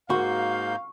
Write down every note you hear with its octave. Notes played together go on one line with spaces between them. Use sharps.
G#2 A#3 F#4 F5 C#6 G6